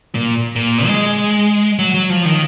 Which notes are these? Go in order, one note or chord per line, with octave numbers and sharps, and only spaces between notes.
A#2
A#2
G#3
F#3
F#3
F3
D#3